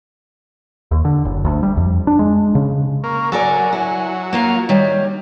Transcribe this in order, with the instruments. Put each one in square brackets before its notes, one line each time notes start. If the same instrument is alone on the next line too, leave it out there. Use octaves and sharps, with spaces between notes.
[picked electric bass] D#2
D3
F#1
D2
G3
F2
D4
G#3
C#3
[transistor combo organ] A#3 [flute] C#6
[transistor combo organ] F#3 [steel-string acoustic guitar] A4 A#4 D5 [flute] G#5
[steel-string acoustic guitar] E4
[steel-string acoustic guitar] A#3 F4 F5 [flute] A#5
[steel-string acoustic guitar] D#3 G3 [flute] C#5